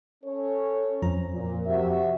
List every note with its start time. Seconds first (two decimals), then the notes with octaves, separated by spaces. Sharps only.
0.24 C#4 A4 C#5
1.02 F2 F3 A#5
1.33 A#2
1.66 C3 F#4 E5